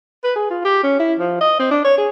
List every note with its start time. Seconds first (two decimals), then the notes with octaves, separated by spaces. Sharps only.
0.24 B4
0.36 G#4
0.50 F4
0.65 G4
0.83 C#4
0.99 E4
1.19 F3
1.41 D#5
1.59 C4
1.71 D4
1.84 C#5
1.98 G#4